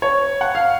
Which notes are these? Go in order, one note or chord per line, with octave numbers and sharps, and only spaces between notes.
C#5
F#5
F5